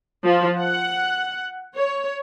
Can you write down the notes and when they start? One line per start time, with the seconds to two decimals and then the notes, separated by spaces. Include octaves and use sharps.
0.25 F3
0.59 F#5
1.75 C#5